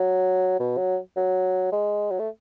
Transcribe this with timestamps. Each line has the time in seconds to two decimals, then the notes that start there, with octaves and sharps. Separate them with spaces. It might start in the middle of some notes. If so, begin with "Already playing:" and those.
Already playing: F#3
0.60 B2
0.78 F#3
1.17 F#3
1.72 G#3
2.11 F#3
2.19 A3